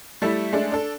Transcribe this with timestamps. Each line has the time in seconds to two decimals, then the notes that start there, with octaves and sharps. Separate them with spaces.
0.22 G3 A3 E4
0.53 G#3 A3 D4
0.72 D4 A4